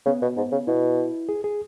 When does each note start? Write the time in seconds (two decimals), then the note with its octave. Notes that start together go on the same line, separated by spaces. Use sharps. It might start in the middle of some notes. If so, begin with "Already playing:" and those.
0.06 C#3 B3
0.22 B2
0.37 G#2
0.52 C#3
0.67 B2 E4
1.29 G#4
1.44 G#4